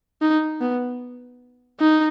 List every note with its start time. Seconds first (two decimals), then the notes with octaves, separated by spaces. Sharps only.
0.22 D#4
0.61 B3
1.80 D#4